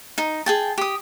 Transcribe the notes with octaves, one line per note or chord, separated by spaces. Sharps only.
D#4
G#4 G5 A5
G4 D#6